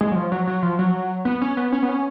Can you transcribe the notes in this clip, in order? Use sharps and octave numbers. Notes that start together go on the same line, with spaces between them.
G#3
F#3
F3
F#3
F#3
F3
F#3
B3
C#4
B3
C#4
B3
C#4